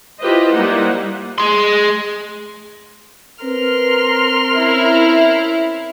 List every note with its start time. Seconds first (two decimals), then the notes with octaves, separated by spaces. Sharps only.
0.20 E4 F4 G4 B4 C5 D#5
0.53 G3 A#3 D#4 E4 C5 F#5
1.38 G#4 C6
3.44 C4 A#4 B4 C6 F6
4.58 C#4 E4